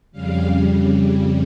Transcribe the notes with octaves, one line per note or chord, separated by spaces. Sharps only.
F2 C#3 G3 F5